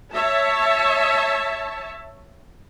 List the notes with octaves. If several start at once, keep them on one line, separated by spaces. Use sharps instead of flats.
C#5 E5 A5